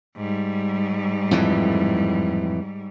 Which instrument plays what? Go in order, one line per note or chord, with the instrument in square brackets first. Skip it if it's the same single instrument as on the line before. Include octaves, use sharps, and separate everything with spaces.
[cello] G#2 G3
[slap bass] F2 A2 E3